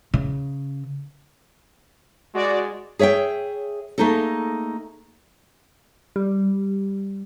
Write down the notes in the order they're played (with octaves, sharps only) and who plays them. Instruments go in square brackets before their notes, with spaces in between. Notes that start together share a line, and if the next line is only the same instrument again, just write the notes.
[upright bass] C#3
[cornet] G#3 [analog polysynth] F#4 D5
[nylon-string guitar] G#4 C#5 E5 F#5 G5
A3 A#3 D#4 G#4 A4
[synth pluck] G3